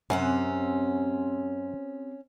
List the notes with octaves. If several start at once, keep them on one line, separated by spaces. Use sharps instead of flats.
F#2 C3 C4 C#4 F#5